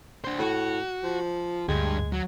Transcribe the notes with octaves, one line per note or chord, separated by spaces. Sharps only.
D4 C5
A2 F#4
F3
D2 G2 G3 G#3
F#3